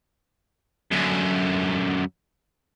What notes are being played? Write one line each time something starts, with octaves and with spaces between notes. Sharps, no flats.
F#2 D3